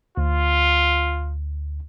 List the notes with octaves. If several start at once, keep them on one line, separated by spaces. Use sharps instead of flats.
D2 F4